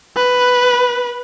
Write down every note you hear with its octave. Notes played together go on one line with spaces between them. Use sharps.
B4